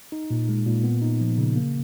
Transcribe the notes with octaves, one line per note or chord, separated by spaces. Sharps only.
D#4
A#2
G#3
A#2
B3
D#4
F3
C#3
A#3